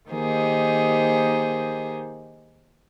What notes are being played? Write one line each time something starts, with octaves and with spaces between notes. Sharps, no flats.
D#3 A#3 D#4 G4 G#4 C5